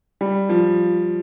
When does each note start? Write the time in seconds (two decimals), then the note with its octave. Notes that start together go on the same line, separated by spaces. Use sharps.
0.21 G3
0.49 F3